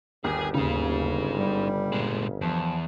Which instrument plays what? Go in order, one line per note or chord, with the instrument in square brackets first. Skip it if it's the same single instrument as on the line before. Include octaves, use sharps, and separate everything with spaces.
[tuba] G1 [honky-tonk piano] D#2 [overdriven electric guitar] G#4 G#5
[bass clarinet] D#2 [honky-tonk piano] C#3 [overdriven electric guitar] D#4 G#4
[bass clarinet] G3
[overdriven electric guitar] A#2 G#3
[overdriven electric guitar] E2 [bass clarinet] F3